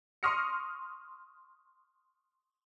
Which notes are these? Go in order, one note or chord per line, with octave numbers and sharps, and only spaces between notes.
C6 C#6 D#6 F6 A#6 C#7